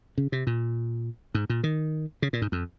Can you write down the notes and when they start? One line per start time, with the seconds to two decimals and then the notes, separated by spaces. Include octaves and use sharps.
0.18 C#3
0.32 C3
0.47 A#2
1.35 G#2
1.50 A#2
1.64 D#3
2.22 C#3
2.33 A#2
2.42 G#2
2.52 F2